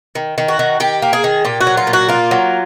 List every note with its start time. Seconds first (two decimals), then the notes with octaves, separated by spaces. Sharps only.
0.15 D#3
0.38 D#3
0.48 F#4
0.59 D#3
0.80 D#3 G4
1.02 A#3
1.13 G#4
1.24 D#3
1.45 A#2 G4
1.61 F#4
1.67 F#3
1.77 F4
1.87 A#2
1.93 F#4
2.09 A#3 F4
2.31 F#3